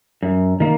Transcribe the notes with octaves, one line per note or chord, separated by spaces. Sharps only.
F#2
D#3 A#3